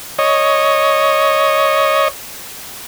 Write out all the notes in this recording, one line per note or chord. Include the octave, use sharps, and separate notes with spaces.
C#5 D#5